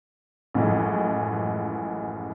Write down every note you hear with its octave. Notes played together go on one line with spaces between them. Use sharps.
A1 F#2 A2 E3 F3 G#3